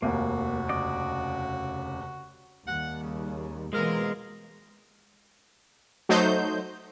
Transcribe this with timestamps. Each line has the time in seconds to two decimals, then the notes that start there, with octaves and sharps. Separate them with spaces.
0.02 F1 D#2 A#3 F#4
0.69 C#3 D5 D#5
2.67 D#2 G3 F#5
3.02 C#3
3.73 B2 E3 G#3 A#3 C4 F4 A#4
6.09 F#3 A3 D#4 C5 G6